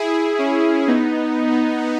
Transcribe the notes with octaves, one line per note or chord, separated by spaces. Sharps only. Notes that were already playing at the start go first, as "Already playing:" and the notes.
Already playing: E4 G#4
C#4 E4
B3 D#4